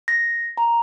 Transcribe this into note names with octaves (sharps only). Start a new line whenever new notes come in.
A#6
A#5